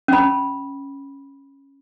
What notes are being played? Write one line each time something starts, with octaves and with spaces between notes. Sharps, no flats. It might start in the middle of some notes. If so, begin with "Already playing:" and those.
C#4 B5